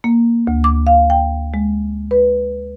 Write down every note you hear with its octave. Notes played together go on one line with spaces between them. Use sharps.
A#3
D2
D6
F5
G5
G#3
B4